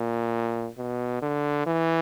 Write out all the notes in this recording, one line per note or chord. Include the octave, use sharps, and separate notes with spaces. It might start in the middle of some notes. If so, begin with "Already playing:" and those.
Already playing: A#2
B2
D3
E3